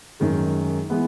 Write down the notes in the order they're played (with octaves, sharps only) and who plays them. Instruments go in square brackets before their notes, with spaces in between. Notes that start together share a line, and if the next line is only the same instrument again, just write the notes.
[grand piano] F#2 D#3 G#3
E3 G#3 B3